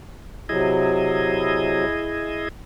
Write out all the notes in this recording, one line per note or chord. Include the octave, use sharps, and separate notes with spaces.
C3 F#3 E4 G#4 D#5